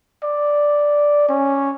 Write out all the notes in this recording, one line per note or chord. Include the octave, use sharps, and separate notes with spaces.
D5
C#4